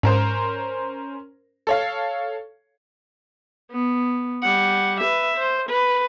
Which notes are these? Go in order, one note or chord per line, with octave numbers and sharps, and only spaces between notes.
G#2 C#4 A#4 C5
A4 C#5 F5
B3
G3 F#5
B4 E5
C5
B4